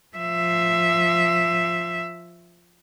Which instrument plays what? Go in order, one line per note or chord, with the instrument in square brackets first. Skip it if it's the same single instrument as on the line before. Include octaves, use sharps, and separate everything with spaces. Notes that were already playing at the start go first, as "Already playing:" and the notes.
[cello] F3 E5